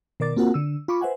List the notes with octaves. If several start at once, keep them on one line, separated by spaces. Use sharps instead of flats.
B2 D#3 A#4 D5 D6 A6
A#3 C4 F4 F#4 A#4 F#5
D3 E6
F4 B5 C#6 D6
B4 C5 E5 F#5 G#5